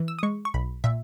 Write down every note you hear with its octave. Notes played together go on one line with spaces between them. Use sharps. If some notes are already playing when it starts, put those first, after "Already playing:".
Already playing: E3
E6
D#6
G#3 C#6
C#6
B1 B5
A#2 E5